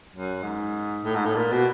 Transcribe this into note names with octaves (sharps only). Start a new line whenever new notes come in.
F#2
G#2
A2
G#2
A2
A#2
B2